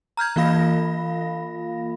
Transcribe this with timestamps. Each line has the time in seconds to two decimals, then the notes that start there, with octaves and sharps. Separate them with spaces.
0.17 A#5 F6 G6 G#6
0.36 E3 A#3 F4 F5 B5 A#6